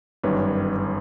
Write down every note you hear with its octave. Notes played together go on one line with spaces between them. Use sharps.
G1 F#2 D#3 G3 B4 C#5